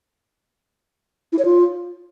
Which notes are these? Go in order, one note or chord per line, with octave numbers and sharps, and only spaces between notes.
E4
C#5
F4